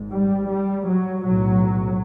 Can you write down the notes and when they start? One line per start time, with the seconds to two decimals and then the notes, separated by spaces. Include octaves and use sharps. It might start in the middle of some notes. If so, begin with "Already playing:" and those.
Already playing: G#1 G#2
0.11 G3
0.48 G3
0.86 F#3
1.23 B1 A2 F#3